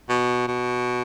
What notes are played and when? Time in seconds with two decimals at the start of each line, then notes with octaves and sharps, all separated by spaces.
0.09 B2
0.47 B2